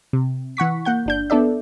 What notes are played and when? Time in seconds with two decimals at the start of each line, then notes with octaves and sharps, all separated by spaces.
0.13 C3
0.57 E3 F#5 C#6 B6
0.85 A#3 F#5 G6
1.06 G1 D4 G6
1.30 B3 D4 A4 D5 E5